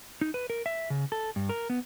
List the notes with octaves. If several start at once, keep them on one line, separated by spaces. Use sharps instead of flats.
D#4
B4
A#4
E5
C#3
A4
G2
A#4
B3